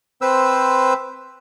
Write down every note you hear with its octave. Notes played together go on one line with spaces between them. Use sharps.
C4 B4 C5 E6